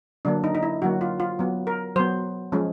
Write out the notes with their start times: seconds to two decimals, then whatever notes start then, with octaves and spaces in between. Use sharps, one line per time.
0.25 D3 F#3 A#3 D4
0.44 D#4
0.55 D#4
0.63 E4
0.82 D3 F#3 A#3 F#4
1.01 F4
1.20 F4
1.39 F#3 B3
1.67 A#4
1.96 F#3 B3 C5
2.52 F3 G#3 C#4